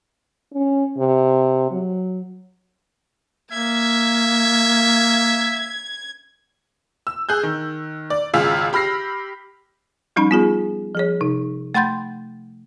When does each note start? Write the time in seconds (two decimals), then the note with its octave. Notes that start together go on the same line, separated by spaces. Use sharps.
0.54 C#4
0.98 C3
1.71 F#3
3.52 A#3 E5 G#6
7.07 E6
7.29 G#4 F#6 G6
7.43 D#3
8.10 D5
8.34 G#1 C#2 F4 G#4 E6 B6
8.73 G4 B5 F6 A#6 C7
10.16 F3 G3 C#4 D#4 B5
10.31 B3 F4 G#4
10.95 F3 G#4 C#5
11.21 C3 D#4
11.74 A3 F#5 B5 C6 G6 A6